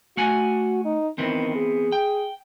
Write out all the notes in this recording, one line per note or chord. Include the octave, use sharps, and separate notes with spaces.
A3 F#4 F#5 G#5
D#4
D#3 E3 B3 C4
G#4
G5